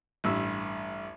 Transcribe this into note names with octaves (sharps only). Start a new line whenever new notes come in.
A1 G2 E6